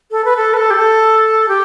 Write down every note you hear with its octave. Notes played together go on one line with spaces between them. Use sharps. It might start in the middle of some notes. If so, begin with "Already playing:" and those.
A4
B4
A4
B4
A4
G4
A4
G4